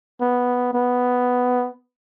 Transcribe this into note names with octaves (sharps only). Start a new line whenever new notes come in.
B3
B3